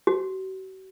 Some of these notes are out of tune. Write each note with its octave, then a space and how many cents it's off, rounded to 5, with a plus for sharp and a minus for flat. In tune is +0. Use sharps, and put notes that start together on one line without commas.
F#4 +40